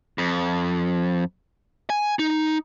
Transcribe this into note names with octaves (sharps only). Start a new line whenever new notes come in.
F2
G#5
D#4